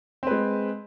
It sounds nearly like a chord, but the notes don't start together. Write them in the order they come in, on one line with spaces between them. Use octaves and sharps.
C4 B4 G#3